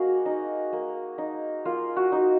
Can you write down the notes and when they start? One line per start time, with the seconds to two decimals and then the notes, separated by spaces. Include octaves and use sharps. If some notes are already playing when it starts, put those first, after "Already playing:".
Already playing: A#3 D#4 F#4 G#4
0.26 D#4
0.73 A#3
1.18 D#4
1.65 A#3 F4
1.96 F#4
2.12 D#4